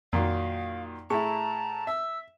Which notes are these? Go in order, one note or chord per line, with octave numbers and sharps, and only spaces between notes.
F2 A#2 D#3 F#3 F5
A2 E4 G#4 A5 A#5 C#6
E5 E6